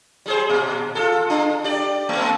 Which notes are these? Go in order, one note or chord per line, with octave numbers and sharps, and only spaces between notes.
G3 G#4 C5
A#2
F4 G#4 A4
D4
G4 D5
A3 B3